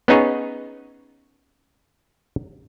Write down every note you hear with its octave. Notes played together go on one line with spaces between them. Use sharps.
B3 C#4 D#4 G#4 C#5